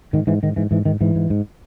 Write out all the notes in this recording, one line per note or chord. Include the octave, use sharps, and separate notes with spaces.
G#2 D#3
G#2 E3
G#2 D#3
G#2 E3
G#2 E3
G#2 D#3
G#2 E3
G#2
G#2